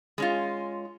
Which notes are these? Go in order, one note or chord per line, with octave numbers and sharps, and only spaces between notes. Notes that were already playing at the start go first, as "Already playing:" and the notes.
G#3 C#4 F4